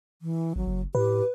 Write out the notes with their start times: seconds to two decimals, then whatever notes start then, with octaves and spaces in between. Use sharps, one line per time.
0.22 E3
0.56 G#1 F#3
0.67 F#1
0.95 A2 G4 B4